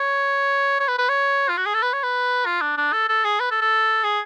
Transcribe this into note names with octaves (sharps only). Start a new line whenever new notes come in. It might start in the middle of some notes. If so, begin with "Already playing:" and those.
Already playing: C#5
C#5
B4
B4
C#5
F4
F#4
G#4
A4
B4
C#5
B4
F4
D4
D4
A4
A4
G#4
B4
A4
A4
G#4